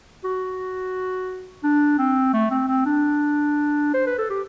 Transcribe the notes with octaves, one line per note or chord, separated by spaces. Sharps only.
F#4
D4
C4
A3
C4
C4
D4
C5
B4
A4
G4